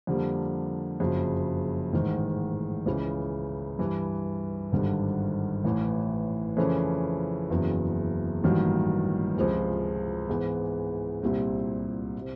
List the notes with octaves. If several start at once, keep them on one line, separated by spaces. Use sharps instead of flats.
F2 D3 G3 A#3
F#1 F2 C#3 F#3
A1 G#2 D#3
C#2 C#3 E3
G2 E3 G3
G#1 G2 D3 G3
A1 A2 E3
F2 C#3 E3 A3 C#4
F#1 E2 C#3 F#3
A1 G2 D#3 F#3 A#3
C#2 C3 F3 G#3 C4
G#2 E3 G#3 B3
C2 A#2 G3 C4
C3